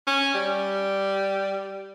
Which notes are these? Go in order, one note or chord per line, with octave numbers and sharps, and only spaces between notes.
C#4
G3